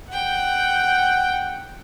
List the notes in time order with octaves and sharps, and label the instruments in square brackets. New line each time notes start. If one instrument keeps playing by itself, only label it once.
[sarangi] F#5 [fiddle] G5